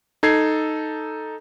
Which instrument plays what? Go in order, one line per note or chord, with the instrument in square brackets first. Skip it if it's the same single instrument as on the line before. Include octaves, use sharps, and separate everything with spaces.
[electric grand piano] D#4 A4 G#6 C7